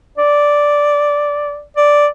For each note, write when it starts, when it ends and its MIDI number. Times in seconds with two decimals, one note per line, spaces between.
0.18 1.62 74
1.77 2.07 74